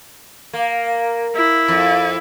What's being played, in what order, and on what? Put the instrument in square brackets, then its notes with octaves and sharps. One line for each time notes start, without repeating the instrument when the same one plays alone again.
[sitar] A#3
[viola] E4
[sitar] F2